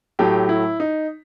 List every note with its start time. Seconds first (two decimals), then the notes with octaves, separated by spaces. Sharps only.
0.19 A2 F#3 A3 G4
0.49 E4
0.80 D#4